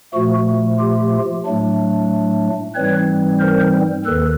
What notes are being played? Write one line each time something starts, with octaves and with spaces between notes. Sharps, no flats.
A#2 F3 A3 F#4
F4 G4
A2 F#3 A3 D4
G#2 E3 G3 C4 B4 C#5
A#4 C5
D#2 D#3 A4 B4